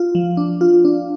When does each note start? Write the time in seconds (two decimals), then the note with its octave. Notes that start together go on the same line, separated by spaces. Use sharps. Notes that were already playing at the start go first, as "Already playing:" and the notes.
Already playing: F4
0.15 F3
0.37 D4
0.61 F4
0.85 D4